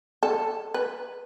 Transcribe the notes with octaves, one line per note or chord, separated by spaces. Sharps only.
A4
B4